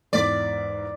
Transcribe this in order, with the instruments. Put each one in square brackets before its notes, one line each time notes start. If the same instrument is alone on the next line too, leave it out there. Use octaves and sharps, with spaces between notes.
[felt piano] E2 G#2 B6 [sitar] D5